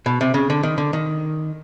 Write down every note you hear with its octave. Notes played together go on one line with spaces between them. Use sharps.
B2
C3
C#3
D3
D#3
D3
D#3